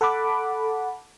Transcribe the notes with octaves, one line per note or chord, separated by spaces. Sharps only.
A4 F#5 A5 B5 D6